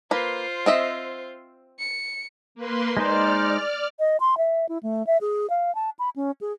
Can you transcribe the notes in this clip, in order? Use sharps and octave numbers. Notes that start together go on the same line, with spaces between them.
A#3 F4 B4 C5
C4 D#5 E5
C#7
A#3 B4 C6
G#3 D#4 C5 D5 F6
D#5
C6
E5
E4
A3
E5
G#4
F5
A5
B5
C#4
G#4